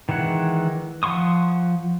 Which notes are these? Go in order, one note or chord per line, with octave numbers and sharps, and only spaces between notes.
D#3 E3 G#3 F#5
F3 F#5 C6 C#6 D#6